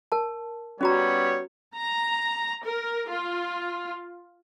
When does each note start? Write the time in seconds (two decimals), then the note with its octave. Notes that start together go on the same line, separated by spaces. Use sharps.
0.12 A#4 A5
0.81 G3 B3 C#4 F#4 C#5 A#5
1.76 A#5
2.64 A#4
3.09 F4